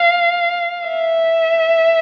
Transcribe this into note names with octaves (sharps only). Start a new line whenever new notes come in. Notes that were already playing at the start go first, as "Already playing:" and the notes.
Already playing: F5
E5